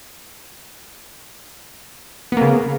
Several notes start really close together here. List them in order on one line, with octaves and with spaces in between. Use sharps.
B3 A#3 C#3